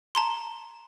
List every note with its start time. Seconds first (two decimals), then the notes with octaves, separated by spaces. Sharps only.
0.15 A5 A#5 C6